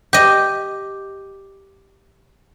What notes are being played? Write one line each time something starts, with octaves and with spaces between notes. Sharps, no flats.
G4 D#5